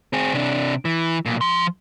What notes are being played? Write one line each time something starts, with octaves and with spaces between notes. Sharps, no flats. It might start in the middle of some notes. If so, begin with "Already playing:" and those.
C4 G#4
C3 D4
E3
B1 A#2
F3 C6